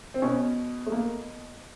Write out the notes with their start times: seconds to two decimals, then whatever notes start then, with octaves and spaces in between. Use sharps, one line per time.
0.14 C4
0.22 B2 C#4
0.86 A3
0.92 A#3